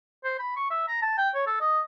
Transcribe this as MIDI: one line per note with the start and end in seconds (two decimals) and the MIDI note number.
0.24 0.36 72
0.39 0.56 83
0.56 0.68 85
0.71 0.84 76
0.88 0.98 82
1.02 1.17 81
1.18 1.30 79
1.34 1.43 73
1.47 1.56 69
1.61 1.80 75